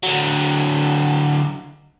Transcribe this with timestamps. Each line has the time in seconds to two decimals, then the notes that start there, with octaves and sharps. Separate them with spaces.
0.03 D3 F#3